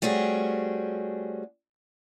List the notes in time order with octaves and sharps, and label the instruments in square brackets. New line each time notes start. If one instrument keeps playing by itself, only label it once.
[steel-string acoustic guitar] G3 A3 C4 C#4 F#4 G#4